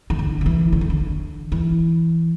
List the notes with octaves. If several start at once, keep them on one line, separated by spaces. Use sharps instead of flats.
E3
D3
D3
E3
D3
E3
D3
E3